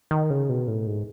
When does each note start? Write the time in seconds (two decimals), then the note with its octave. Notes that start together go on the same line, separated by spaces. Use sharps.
0.11 D#3
0.30 C#3
0.49 B2
0.68 A2
0.87 G#2